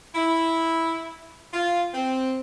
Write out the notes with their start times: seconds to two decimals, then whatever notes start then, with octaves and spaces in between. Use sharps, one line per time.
0.15 E4
1.52 F4
1.93 C4